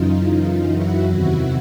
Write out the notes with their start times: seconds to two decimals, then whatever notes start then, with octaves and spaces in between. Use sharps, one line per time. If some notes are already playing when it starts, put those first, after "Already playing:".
Already playing: F#2 C#3 E3 D#4 F4
0.29 D#4 F4
0.69 E4 F#4
1.09 E2 C3 D#3 E4 F#4